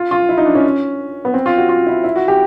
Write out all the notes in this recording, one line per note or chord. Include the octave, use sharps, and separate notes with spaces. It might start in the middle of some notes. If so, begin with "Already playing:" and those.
Already playing: F4
F4
E4
D#4
D4
C#4
B3
C4
F4
F#4
F4
E4
E4
F#4
G4